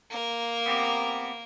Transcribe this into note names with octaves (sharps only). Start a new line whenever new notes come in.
A#3 A#4
B3 C4 G4